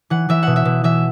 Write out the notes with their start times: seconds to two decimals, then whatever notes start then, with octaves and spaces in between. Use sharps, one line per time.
0.10 E3 F#5
0.29 E3 E5
0.43 B2 F#5
0.56 E5
0.65 B2
0.84 E3 E5